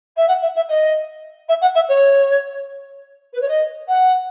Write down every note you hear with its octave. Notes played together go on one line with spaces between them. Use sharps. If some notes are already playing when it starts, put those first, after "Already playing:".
E5
F#5
E5
E5
D#5
E5
F#5
E5
C#5
B4
C#5
D#5
F#5